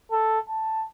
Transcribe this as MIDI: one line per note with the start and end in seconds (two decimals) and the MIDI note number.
0.11 0.39 69
0.49 0.86 81